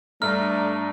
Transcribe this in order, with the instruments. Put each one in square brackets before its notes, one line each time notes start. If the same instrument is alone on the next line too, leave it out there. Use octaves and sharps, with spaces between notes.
[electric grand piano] G2 A#5 [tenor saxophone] A3 [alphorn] D4 [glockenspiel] F6